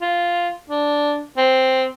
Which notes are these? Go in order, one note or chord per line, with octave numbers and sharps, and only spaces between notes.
F4
D4
C4